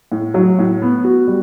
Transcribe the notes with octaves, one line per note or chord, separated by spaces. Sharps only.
A2
F#3
A2
B3
F#4
G3